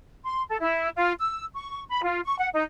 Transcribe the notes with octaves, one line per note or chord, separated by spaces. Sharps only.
C6
A4
E4
F4
E6
C#6
B5
F4
C#6
F#5
D#4